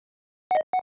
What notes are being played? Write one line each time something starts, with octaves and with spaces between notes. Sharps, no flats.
F#5
D#5
F#5